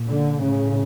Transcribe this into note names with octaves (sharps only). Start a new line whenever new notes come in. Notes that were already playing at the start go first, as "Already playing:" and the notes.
Already playing: A#2
D3
A2 C#3